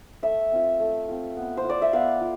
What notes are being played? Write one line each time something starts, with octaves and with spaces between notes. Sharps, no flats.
A3 E5
C4 F4
A3
C4 F4
B3
C5
F4 D5
E5
B3 F5
F4